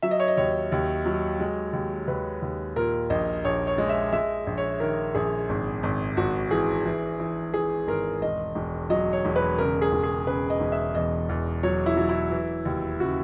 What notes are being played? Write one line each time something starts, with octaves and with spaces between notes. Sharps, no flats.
F#3 E5
D#5
C#5
D#5
D#2 C#5
D#2
F#3
G#3
D#2
D#2 B4
D#2
A#2 A#4
A#1 D#5
A#1 C#5
C#5
G#3
E5
G#3 E5
A#1
C#5
D#3 A#4
A#1 G#4
G#1
G#1
G#1 F#4
E3 G#4
E3
E3
E3 G#4
G#1 A#4
E1 D#5
E1
F#3 D#5
C#5
E1
B4
C#3 A#4
G#4
E1
G#4
C#3 B4
D#5
E1
E5
E2 D#5
E2
F#3 C#5
E4
F#3
E4
E3
D#2
C#3 F#4